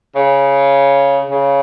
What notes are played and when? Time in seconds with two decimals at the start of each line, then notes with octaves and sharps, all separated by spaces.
0.15 C#3
1.29 C#3